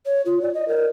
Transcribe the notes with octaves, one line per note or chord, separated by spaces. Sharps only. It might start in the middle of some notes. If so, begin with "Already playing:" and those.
C#5
F4
D5
D#5
A#4